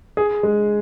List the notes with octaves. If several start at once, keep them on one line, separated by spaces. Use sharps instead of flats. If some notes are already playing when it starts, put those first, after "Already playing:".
G#4
G#3